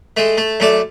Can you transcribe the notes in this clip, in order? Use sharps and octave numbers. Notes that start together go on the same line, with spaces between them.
G#3 A3
A3
F#2 A3 D5